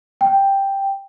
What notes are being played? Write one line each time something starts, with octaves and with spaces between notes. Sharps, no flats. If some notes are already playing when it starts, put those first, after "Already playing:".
G5